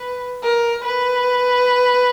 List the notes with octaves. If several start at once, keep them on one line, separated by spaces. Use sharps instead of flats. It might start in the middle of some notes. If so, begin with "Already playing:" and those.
Already playing: B4
A#4
B4